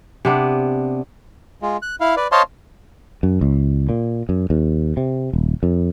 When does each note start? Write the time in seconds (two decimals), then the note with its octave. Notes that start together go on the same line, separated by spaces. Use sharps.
0.25 C3 B3 D4
1.62 G#3 F4
1.82 F#6
2.00 E4 F5
2.17 B4 D5
2.32 C5 C#5 D#5 F5 A5 C6
3.23 F#2
3.41 C#2
3.89 A#2
4.29 F#2
4.50 D#2
4.97 C3
5.33 D#1
5.63 F2